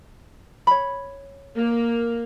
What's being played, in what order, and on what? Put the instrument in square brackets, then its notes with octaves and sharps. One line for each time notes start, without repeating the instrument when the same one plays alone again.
[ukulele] C#5 B5
[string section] A#3